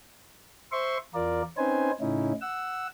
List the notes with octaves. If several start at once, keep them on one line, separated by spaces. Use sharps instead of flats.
C5 E5 C6 C#6
E2 F4 A#4 D5
C4 C#4 D#4 B4 C5 G#5
A2 C#3 C#4 D#4 E4
F#5 E6